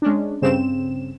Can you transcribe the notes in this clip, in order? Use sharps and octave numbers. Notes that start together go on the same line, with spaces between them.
G#3 C#4 D4
G2 C#3 C4 E7